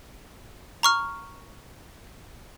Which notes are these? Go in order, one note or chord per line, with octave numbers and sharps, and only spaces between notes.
A#5 C#6 F6